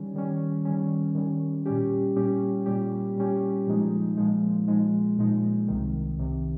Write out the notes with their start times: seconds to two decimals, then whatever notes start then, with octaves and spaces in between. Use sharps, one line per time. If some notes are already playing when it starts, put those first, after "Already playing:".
Already playing: D#3 G3 C#4
0.15 D#3 G3 C#4
0.65 D#3 G3 C#4
1.15 D#3 G3 C#4
1.65 A#2 G3 C#4 G4
2.16 A#2 G3 C#4 G4
2.66 A#2 G3 C#4 G4
3.16 A#2 G3 C#4 G4
3.66 A#2 F3 G#3 D#4
4.17 A#2 F3 G#3 D#4
4.68 A#2 F3 G#3 D#4
5.18 A#2 F3 G#3 D#4
5.68 C2 C3 D#3
6.18 C2 C3 D#3